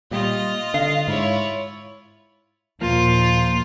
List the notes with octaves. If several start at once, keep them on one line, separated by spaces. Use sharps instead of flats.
A#2 G3 F4 D#5
D3 F5
G#2 E4 C#5
D#2 A#2 F3 A#3 F4